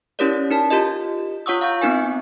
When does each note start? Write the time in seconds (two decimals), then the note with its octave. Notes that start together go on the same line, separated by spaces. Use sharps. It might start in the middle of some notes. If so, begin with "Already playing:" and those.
0.19 C#4 E4 G4 A#4 C#5 D5
0.51 D#4 A#4 A5
0.70 F4 G4 A#4 D#5
1.46 F4 C#5 F#5 C#6 D#6 E6
1.61 F5 F#5 A#5 C#6 G6
1.82 B3 C4 D#4 A#4 G#5